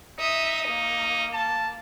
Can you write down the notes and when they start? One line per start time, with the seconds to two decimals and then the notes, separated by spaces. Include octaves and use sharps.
0.19 D#4 E5 D#6
0.68 A#3
1.33 A5